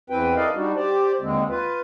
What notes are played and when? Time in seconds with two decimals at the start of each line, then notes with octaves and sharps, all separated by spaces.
0.10 E2 E3 C4 B4 G5
0.36 E4 A4 A#4 D5 D#5 F5
0.55 G3 D4 D#4 F#4
0.76 G4 C5 D5
1.21 D#2 D3 G#3 C4
1.50 F4 B4